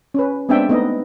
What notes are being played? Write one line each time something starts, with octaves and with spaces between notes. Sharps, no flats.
C#4 B4
G#3 B3 C4 D4 E5 G5
A3 B3 D#4 D#5